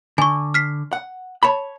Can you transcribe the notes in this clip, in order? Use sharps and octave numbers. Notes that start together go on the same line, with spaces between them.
D3 G#5 C#6
F6 B6 C7
F#5
C#5 A5 B5